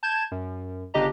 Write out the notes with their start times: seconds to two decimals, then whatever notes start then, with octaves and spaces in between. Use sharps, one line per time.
0.03 A5 G6 G#6 E7
0.31 F#2
0.94 G1 C#3 D4 G4 D#5 A#5